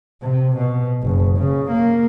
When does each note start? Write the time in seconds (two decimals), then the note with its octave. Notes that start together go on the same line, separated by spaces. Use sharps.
0.23 C3
0.57 B2
1.02 F#1
1.38 C#3
1.71 A#3